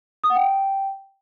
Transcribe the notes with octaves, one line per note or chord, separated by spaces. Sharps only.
D#6
F#5
G5